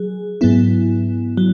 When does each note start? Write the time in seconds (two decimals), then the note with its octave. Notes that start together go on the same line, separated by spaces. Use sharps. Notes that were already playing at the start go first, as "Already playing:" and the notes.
Already playing: F#3 G#4
0.41 G#2 F#3 B3 E4
1.37 F#3